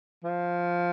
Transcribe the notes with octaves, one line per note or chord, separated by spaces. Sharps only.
F3